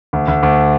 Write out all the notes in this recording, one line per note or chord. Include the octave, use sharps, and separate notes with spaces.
D2
D2
D2